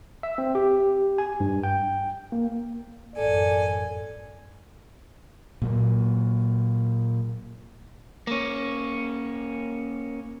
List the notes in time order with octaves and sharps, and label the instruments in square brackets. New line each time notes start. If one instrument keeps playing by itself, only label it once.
[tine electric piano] E5
C4
G4
G#5
G2
G5
A#3
[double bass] A1 F#2 [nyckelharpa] A4 [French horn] D5 [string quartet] G#5
[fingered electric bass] A#2 F#3 A#3
[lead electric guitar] A#3 C#4